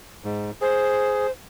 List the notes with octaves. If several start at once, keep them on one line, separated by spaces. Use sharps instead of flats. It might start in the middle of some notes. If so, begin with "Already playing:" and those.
G#2
G#4 C5